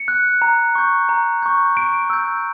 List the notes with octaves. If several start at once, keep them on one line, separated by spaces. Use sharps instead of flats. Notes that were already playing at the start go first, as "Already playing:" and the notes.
Already playing: C#7
F#6
A#5
C#6 G6
A#5
C#6 G6
C#6 D7
E6 G6